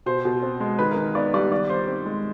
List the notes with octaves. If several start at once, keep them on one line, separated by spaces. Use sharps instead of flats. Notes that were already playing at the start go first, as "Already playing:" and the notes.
B2 C5
B2
C4
G#3
D#3 B4
A#4
D#3
B3 D5
G3 D5
D#3 D5
D#3 C5
C4
G#3